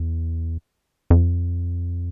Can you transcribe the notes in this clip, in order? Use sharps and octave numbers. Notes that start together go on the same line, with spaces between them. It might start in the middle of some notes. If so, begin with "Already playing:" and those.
Already playing: E2
F2